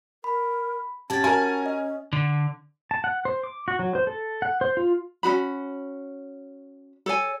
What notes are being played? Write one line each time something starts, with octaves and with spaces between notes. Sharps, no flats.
A#4 B5
C#4 F#4 G4 A5 G#6 A6
F#4 A#4 G#5
D#5
D3
A5
F#5
C5
D6
F#4
F#3
C5
A4
F#5
C5
F4
C#4 D#4 F#4 B5
A4 C#5 G#5